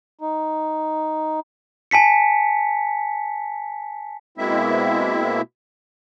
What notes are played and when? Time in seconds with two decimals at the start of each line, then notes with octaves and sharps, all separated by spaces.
0.21 D#4
1.91 G#5 A5 B6 C#7
4.38 B2 G#3 A#3 C4 E4 E5